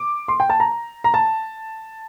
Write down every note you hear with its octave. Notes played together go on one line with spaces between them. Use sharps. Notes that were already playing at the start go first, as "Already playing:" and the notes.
Already playing: D6
C6
G5
A5
A#5
A#5
A5